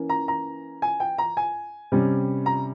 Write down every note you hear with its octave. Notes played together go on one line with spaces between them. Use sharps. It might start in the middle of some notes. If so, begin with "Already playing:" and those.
Already playing: E3 A#3 C#4
A#5
A#5
G#5
G5
A#5
G#5
C3 G3 C#4
A#5